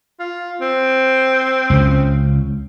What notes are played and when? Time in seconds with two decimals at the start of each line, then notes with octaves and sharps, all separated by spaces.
0.20 F4
0.61 C4
1.70 C#2 C#3